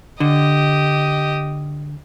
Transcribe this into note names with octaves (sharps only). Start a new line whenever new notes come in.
D3 G4 D#5